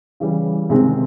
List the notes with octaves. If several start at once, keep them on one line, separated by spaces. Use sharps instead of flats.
C#3 E3 G3
C#2 C3 D#3 G#3 C4